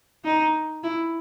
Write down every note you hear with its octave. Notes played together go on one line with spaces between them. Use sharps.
D#4
E4